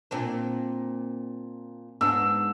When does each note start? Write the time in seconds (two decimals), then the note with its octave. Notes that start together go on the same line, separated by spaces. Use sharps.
0.11 A#2 C4 D4
2.01 G#2 B3 D4 E6